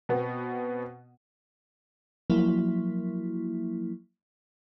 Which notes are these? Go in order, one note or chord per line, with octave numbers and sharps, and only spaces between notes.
B2 B3 C4
F3 F#3 A#3 E4